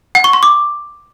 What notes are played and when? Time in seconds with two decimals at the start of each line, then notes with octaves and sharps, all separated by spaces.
0.15 F#5
0.24 C#6
0.33 C6
0.43 D6